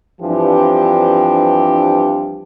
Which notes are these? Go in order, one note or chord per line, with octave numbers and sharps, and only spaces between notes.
G2 E3 F3 C4 D4 G4